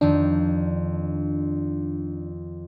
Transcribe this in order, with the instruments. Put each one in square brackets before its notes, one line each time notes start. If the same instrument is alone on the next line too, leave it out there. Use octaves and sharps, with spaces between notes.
[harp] F2 D#3 [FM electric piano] D4